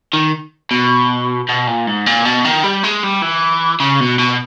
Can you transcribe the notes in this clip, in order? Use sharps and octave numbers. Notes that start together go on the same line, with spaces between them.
D#3
B2
B2
A#2
G#2
A#2
B2
D#3
G3
G#3
G3
E3
C#3
B2
B2